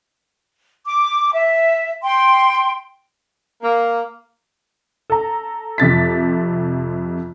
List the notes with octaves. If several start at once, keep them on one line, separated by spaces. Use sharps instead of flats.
D6
E5
G5 C6
A#3
A4 A#5
F2 C3 A6 B6